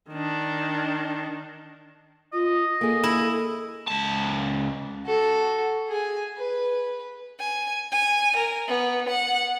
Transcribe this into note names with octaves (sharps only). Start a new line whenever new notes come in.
D#3 D4
F4 D#5
A#3 G#4 A4
E4
C#2 A5
F#4 A4
G#4 G#5
B4
G#5
G#5
A#4
B3
F#5